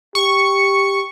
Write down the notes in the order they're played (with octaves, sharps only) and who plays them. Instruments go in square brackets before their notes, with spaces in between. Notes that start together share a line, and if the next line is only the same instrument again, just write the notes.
[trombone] G4 [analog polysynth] C#6